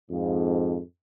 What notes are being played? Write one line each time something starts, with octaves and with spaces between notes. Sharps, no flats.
F2 G#2